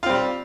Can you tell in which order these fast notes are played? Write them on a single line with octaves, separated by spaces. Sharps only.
F4 C4 G3